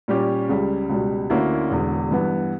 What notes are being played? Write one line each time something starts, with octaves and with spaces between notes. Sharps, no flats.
A#2 G3 C#4 G4
C#2 C#3 G3
C#2 B2 G3
D2 D3 A#3 C#4 E4
E1 E2 D3
G2 E3 B3